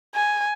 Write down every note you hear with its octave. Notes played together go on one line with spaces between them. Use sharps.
G#5